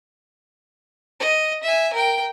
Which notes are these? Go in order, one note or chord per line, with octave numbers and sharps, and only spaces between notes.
D#5
E5 G#5
A#4 G5